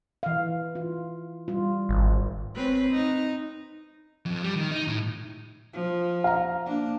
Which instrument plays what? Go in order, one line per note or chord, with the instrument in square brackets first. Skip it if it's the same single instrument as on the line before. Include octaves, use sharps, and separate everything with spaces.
[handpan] E3 F5
F4
G3 F4
[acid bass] G#1
[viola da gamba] C4 C#4 B4
D#4
[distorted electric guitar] F2
G3
D#3
D#4
A2
[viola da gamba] F3
[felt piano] F5 A#5
[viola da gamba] A#3 D4